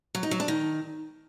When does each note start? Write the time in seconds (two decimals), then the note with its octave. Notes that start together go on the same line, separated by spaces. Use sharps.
0.15 F#3
0.23 D#4
0.31 F#3
0.40 D4
0.48 D#3